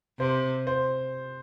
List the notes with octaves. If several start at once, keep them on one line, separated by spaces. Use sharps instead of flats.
C3 C5
C5